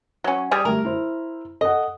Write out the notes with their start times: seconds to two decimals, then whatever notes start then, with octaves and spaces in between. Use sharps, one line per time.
0.24 F#3 C#4
0.51 G3 G4 G#4
0.65 G3 A3 A#4
0.85 E4 C5
1.61 A4 D#5 F#5